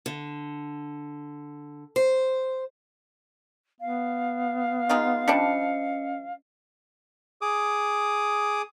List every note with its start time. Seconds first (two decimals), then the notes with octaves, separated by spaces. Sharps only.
0.06 D3
1.96 C5
3.80 B3 F5
4.89 G#3 D#4 F4
5.28 F3 G3 C#4 D4 D#5 C#7
7.41 G#4 D6 D#6